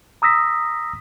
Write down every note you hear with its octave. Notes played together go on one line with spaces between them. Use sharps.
A#5 D#6 E6 A#6 B6